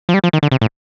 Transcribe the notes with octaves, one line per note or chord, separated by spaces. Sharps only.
F3
G3
F3
D#3
D3
C3
A2